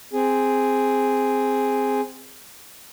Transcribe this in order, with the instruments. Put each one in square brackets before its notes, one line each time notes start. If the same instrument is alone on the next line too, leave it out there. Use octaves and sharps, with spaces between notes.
[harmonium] C4 G#4